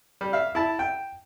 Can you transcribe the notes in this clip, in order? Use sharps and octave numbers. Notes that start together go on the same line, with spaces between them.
G3
E5 F5
E4 A5
G5